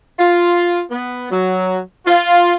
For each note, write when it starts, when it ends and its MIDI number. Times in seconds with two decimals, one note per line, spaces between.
0.19 0.81 65
0.90 1.30 59
1.31 1.78 54
2.06 2.56 65